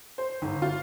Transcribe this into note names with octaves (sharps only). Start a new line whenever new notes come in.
C5
G1 G#2
F4